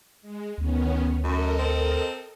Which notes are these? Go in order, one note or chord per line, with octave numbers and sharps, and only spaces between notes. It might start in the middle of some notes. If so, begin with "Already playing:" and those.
G#3
D2 D#3 B3 C#4
F#2 A4 A#4 D#5
C4